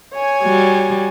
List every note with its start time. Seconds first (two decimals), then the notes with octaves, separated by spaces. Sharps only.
0.14 C#5 G#5
0.43 G3 F#4